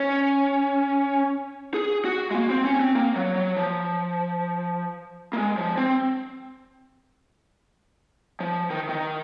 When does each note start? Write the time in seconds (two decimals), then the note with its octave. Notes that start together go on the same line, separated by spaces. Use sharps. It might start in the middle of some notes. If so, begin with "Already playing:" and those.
Already playing: C#4
1.74 G#4
2.05 F#4
2.31 G#3
2.35 A#3
2.50 C4
2.65 C#4
2.80 C4
2.95 A#3
3.16 F#3
3.36 F#3
3.57 F3
5.33 A#3
5.38 G#3
5.58 F3
5.77 C4
8.40 F3
8.70 D#3
8.89 D#3